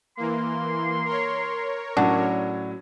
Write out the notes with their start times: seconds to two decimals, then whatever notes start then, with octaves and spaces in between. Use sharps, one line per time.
0.17 E3 A#3 C6
1.05 A#4 C#5
1.97 A2 F#3 C#4 D4 F#4